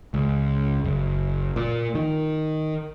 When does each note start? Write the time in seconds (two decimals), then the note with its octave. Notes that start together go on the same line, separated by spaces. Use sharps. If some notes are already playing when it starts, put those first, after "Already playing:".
0.14 C#2
0.85 F#1
1.56 A#2
1.95 D#3